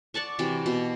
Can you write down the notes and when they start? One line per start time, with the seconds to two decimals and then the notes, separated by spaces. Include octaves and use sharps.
0.14 D5 F#5 A5 C#6
0.39 C3 E3 F#4 G5
0.66 B2